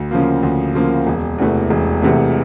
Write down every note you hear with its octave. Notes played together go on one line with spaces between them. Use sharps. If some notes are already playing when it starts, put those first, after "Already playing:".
Already playing: D2
C#3 F3 A#3
D2
C#3 F3 A#3
E1
E2 C3 E3 A3
E1
E2 C3 E3 A3